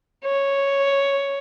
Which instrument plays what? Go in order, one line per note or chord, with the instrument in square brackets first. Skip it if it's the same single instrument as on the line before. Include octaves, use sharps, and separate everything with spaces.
[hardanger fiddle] C#5